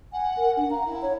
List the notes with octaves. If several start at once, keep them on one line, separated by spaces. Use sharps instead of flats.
F#5 G#5
A#4
D4 F#5
F5 A#5
E4
C#5